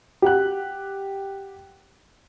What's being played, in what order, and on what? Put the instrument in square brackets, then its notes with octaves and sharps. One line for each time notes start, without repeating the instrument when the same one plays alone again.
[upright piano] G4 F#5 F#6